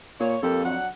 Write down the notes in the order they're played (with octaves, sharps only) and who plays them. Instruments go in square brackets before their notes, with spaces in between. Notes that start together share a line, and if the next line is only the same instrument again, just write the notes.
[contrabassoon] A#2 [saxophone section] C#5
[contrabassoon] F2 [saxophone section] A#3 G4 A4
[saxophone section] F#3 D4 F#5